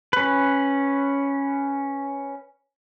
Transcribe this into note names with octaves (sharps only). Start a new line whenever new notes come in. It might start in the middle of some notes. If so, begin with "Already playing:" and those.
C#4 B4